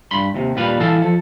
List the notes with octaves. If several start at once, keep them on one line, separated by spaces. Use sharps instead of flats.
G2 B5 C6
D#2 C3
D#2 A#2 G3 B4 F5
E3 E4 A4 F5 A5
F3 A4